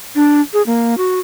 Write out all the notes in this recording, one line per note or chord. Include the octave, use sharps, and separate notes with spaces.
D4
G#4
A#3
F#4